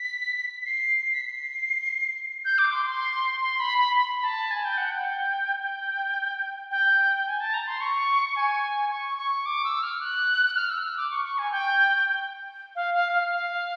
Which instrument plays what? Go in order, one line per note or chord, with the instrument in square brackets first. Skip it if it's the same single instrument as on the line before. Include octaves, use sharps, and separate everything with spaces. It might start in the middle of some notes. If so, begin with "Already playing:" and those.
Already playing: [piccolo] B6
C7
B6
C7
G6
D6
C6
C6
C6
B5
B5
B5
A5
G#5
G5
F#5
G5
G5
G5
G#5
A5
A#5
C6
C#6
G#5
C#6
C#6
D6
E6
F6
F#6
F6
E6
E6
D6
C#6
C#6
G#5
G5
F5
F5
F5
F5